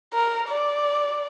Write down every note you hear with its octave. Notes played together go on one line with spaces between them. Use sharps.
A#4
D5